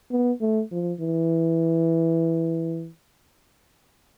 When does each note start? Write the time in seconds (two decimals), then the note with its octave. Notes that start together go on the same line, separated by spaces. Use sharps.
0.11 B3
0.41 A3
0.72 F3
1.01 E3